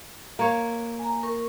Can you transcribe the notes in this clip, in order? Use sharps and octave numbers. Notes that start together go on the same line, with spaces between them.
A#3 C#5
G#5 A#5
A#4 C#6